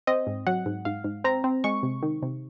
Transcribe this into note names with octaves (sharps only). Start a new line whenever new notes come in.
C4 D#5
G#2
F#3 F#5
G#2
G#2 F5
G#2
C4 A#5
C4
G#3 C#6
C3
D#3
C3